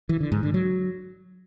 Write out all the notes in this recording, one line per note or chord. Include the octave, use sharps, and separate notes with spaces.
E3
D3
G#2
D3
F#3